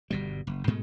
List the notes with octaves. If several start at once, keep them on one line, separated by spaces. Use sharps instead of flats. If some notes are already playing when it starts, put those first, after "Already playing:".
G1 B2 G3
F#1
G#2 B2 G#3 A3